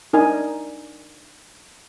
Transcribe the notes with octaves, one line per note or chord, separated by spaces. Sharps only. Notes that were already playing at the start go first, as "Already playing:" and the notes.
D4 D#4 A#4 G#5